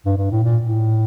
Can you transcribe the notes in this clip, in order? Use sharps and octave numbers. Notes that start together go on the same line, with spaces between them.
G2
G2
A2
A#2
A2